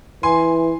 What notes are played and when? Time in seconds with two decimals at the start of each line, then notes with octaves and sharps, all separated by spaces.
0.23 E3 G#5 C6